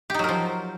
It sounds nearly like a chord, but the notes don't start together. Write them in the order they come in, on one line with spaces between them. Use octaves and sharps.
G4 D#4 F#3 A#4 F3